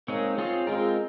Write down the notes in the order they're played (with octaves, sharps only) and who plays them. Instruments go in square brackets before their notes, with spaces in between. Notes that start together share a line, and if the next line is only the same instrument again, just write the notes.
[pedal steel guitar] G#3 C4 D#4 G#4 C#5 [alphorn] A#3
[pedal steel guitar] C4 F4 G#4 C#5
[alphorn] G#3 [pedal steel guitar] C4 F4 A#4